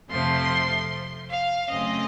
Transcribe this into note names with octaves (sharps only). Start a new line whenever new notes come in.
F2 C3 F3 A3 C6
F5
F#2 C#3 A3 C4 D#5